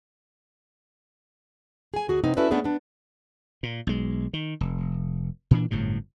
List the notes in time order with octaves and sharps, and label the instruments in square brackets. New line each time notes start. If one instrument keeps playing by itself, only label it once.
[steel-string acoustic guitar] G#4 G#5
D2 F#4 G#4
C3 B3 C4 D#4
C#4 E4 F#4 A4 B4 D5
A3 B3 C#4 D4 G#4 B4
B3 D4
[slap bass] A#2
B1 G#3
D#3
F1
A#2 E3 D4
G1 F#2 A2 C3